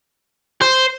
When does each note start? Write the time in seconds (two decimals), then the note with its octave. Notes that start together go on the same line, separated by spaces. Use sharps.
0.62 C5